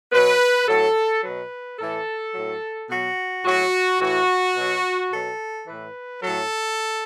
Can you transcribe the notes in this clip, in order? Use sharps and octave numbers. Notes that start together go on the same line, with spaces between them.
B2 F#3 B4
A2 F#3 A4
F#3 B4
B2
A2 E3 A4
A2 F#3
B2 F#3 F#4
A2 F#3 F#4
A2 E3 F#4
B2 F#3
B2 F#3 A4
A2 E3 B4
A2 F#3 A4